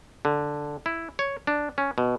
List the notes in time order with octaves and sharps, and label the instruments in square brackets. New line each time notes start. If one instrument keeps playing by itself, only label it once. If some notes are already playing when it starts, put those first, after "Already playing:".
[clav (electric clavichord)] D3
E4
C#5
D4
C#4
B2